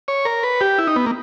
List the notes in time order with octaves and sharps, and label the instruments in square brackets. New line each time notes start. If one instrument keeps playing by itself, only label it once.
[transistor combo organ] C#5
A#4
B4
G4
E4
D#4
B3
A#3